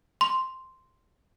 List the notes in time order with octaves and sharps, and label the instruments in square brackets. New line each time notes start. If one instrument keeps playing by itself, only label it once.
[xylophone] C6